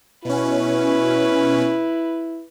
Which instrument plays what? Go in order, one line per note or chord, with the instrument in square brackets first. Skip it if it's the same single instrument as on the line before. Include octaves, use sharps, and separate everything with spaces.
[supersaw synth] B2 C#4 [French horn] E4 [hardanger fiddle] B4